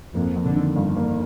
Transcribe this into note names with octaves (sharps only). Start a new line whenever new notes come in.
F2 A#3
F2
D3
D#3
G1
A#3